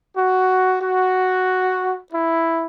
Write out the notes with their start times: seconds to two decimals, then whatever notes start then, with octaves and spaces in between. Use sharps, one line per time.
0.17 F#4
0.82 F#4
2.13 E4